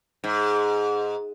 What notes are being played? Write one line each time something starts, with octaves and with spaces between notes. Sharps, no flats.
G#2